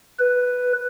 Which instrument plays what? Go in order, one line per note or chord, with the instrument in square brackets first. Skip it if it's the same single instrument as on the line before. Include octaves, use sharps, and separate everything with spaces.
[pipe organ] B4